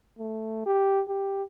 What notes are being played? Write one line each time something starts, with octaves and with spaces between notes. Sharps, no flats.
A3
G4
G4